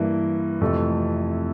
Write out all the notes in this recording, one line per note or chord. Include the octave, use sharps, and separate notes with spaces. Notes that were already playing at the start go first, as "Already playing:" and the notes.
Already playing: G2 E3 A#3
F2 C3 E3 A3 A4